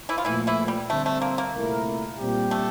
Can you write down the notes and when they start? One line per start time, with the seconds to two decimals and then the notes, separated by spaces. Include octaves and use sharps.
0.09 E3 E4
0.18 F4
0.25 A#2 E3 F3 A3 E4
0.47 E3 E4
0.68 G3
0.89 D3 G3 A3 C4
1.06 A3
1.22 A#3
1.38 A#3
1.54 C2 A#2 A3 E4 A#4
2.18 A#2 G3 C4 G4
2.51 A3